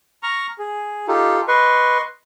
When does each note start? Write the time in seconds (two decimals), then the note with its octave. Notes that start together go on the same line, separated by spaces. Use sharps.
0.23 A#5 C#6 F6
0.59 G#4
1.08 D#4 F4 G4 A4
1.48 B4 D#5 C6 C#6